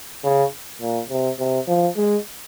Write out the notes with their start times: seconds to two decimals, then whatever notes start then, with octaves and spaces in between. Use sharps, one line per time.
0.24 C#3
0.81 A#2
1.10 C3
1.39 C3
1.68 F3
1.96 G#3